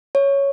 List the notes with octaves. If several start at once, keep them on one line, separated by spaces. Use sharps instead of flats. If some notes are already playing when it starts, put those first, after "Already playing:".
C#5